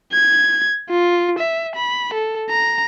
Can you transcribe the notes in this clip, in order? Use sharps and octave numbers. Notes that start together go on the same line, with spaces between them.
G#6
F4
E5
B5
A4
A#5